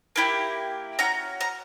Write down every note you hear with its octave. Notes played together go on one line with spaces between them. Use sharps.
A#3 E4 G4
C#4 F#4 A#5
A#5